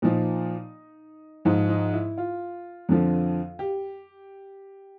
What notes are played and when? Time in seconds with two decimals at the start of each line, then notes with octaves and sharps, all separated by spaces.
0.02 A#2 F3 D#4
1.45 G#2 F3 D#4
1.69 D#4
1.94 E4
2.18 F4
2.89 F2 D3 F3
3.59 G4